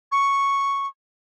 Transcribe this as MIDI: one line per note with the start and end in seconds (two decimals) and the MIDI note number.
0.12 0.87 85